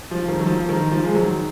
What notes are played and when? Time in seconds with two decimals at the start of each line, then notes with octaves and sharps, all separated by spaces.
0.11 F3
0.28 D#3
0.39 F#3
0.46 F3
0.69 D#3
0.92 F3
1.04 G#3
1.15 D#3 F#3